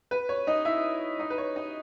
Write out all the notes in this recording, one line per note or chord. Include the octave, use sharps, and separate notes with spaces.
B4
C#5
D#4 D#5
E4 E5
D#4 D#5
B4
C#5
D#4 D#5